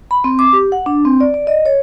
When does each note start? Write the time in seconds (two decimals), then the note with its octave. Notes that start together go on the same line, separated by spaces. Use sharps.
0.11 B5
0.24 C4
0.39 D6
0.53 G4
0.72 F#5
0.86 D4
1.05 C4
1.20 D5
1.34 D5
1.47 D#5
1.66 C#5